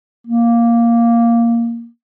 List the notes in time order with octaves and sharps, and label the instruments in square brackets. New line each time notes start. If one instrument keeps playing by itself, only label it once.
[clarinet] A#3